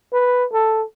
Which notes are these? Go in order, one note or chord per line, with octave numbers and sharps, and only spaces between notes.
B4
A4